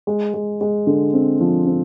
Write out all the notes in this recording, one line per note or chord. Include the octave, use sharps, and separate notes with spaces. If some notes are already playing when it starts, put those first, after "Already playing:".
G#3
G#3
G#3
D3
C4
F3
C4